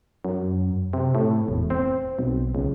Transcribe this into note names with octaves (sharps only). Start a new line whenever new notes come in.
F#2
C3
A2
E1
C4
B1
C#2